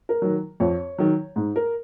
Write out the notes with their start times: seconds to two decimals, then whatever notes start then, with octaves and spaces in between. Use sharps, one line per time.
0.09 A#4
0.22 D#3 F#3
0.60 F2 C#5
0.98 D#3 F#3
1.36 G#2
1.56 A#4